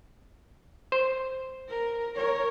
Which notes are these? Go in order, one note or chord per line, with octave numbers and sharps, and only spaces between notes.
C5
A#4
A#4 C#5